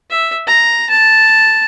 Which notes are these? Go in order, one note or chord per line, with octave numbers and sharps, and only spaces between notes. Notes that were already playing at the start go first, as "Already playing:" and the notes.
E5
A#5
A5